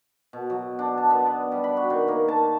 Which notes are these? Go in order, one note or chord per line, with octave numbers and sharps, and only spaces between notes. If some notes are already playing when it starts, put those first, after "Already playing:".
B2
F#3
D4
A5
B3
D5
G3
B5
F#4
D#3
A#3
A5